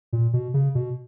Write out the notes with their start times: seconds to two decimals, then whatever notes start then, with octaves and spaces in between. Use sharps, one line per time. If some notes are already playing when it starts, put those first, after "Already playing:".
0.13 A#2
0.33 B2
0.54 C#3
0.75 B2